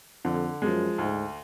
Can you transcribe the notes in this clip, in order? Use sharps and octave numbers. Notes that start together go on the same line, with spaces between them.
F2 D3
F#2 F3 G#3
D2 G#2